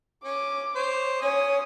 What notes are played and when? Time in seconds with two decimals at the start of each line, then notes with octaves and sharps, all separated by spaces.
0.24 C#4 D6
0.75 C5 C#5
1.22 C#4 C#5 G#5 D#6